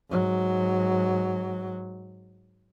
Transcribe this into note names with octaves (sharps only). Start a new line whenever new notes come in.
G#2 F#3